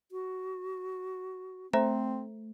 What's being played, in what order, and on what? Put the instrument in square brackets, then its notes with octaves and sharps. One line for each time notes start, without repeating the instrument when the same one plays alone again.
[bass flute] F#4
[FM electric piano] A3 [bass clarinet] C4 [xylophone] C5 E5 A#5